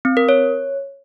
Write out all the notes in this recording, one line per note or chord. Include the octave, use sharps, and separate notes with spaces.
C4
A#4
C#5